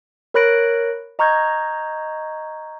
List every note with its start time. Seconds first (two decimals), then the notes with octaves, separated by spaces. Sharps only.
0.34 A#4 C#5 B5 F#6 A#6 D7
1.19 D#5 A#5 C#6 F6 G6 G#6